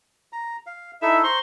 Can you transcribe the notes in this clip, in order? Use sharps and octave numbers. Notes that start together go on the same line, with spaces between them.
A#5
F5
D#4 E4 A4 E5
C5 A#5 C6 C#6